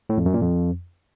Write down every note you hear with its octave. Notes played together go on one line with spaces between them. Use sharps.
A2
F2
F#2
A#2
F2